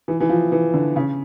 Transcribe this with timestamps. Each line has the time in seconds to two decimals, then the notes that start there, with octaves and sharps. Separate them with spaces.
0.08 E3
0.20 E3
0.29 F3
0.52 E3
0.74 D3
0.96 C#3